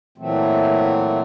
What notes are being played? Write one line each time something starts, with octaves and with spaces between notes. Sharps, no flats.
A#2 E3 F#3 A3 C4